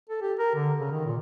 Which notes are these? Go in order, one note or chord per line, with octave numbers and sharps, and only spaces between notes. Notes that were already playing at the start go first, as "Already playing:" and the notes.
A4
G4
A#4
D3
C#3
D#3
A#2